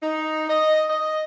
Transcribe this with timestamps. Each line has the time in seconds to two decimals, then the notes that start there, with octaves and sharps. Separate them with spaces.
0.03 D#4
0.49 D#5
0.90 D#5